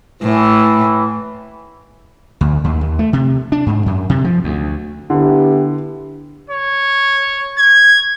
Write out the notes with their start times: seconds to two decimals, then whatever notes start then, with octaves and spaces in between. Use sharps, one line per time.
0.22 A2 E3
2.41 D2
2.64 D#2
2.81 D#2
2.99 A3
3.13 C3
3.52 D4
3.66 G#2
3.86 F#2
4.10 C3
4.24 F3
4.44 D2
5.10 D3 B3 E4 G4
6.50 C#5
7.58 G#6